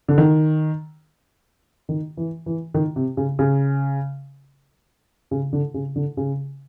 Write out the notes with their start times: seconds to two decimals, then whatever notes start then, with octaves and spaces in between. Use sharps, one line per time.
0.08 D3
0.18 D#3
1.89 D#3
2.17 E3
2.46 E3
2.74 D#3
2.96 C3
3.17 C#3
3.39 C#3
5.31 C#3
5.53 D3
5.74 C#3
5.96 D3
6.17 C#3